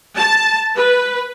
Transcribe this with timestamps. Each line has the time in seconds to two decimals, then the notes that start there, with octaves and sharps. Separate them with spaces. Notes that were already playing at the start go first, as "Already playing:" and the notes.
0.16 A5
0.75 B4